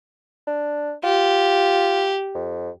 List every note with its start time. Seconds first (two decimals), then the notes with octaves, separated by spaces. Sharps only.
0.47 D4
1.04 F4 G4
2.35 F2